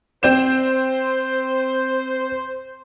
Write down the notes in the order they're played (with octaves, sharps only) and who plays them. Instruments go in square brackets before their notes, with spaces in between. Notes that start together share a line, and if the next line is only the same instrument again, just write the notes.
[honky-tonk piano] C4 G6 E7 [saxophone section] C5